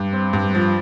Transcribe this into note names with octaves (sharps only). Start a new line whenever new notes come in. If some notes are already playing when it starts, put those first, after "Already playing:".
Already playing: G2
C4
G2
F3